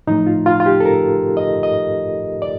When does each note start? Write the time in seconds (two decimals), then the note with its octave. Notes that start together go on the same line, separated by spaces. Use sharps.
0.07 A2 F3 A3 D#4
0.27 F4
0.46 F4
0.60 F4
0.66 G4
0.80 A4
0.85 A#4
1.37 D#5
1.63 D#5
2.42 D5